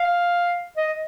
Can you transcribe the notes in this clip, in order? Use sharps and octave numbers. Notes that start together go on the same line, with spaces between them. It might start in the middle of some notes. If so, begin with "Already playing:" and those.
Already playing: F5
D#5